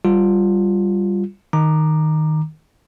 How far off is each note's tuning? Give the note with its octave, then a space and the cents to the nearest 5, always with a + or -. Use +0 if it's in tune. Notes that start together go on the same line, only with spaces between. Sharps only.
G3 +0 F4 +0
D#3 +0 A#5 +0 D6 +15